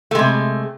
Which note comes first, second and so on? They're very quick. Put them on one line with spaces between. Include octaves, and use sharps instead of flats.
A3 G#3 C3